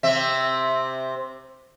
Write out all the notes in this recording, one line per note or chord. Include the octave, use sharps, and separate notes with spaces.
C3 C4 E5